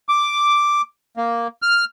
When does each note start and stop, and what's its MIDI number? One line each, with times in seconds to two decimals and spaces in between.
0.09 0.82 86
1.17 1.47 58
1.62 1.85 89